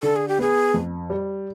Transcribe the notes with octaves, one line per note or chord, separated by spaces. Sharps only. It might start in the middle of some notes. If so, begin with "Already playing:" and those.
D3 A4
G#4
G4
B3 G#4
F2
G3